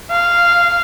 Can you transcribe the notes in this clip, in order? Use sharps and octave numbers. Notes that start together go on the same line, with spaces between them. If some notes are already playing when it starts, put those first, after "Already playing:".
F5